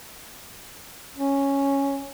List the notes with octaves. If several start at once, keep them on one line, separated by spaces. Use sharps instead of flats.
C#4